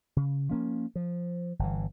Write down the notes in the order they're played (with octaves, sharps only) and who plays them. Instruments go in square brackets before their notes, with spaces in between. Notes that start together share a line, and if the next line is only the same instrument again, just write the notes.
[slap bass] C#3
F3 A#3 C#4
F3
G1 E3